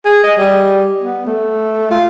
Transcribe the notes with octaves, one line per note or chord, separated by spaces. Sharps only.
G#4
D#5
G3
B3
A3
F4